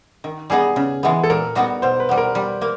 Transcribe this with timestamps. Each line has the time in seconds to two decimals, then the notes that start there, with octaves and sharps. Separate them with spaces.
0.24 D#3
0.50 G3 B3 D#4 G#4
0.76 C#3
1.03 E3 G#3 B3
1.24 A4
1.30 A#2 A#4
1.55 G3 B3 D#4 F#4
1.82 B2 C5
2.00 B4
2.09 G3 B3
2.18 A#4
2.35 G3
2.61 A#3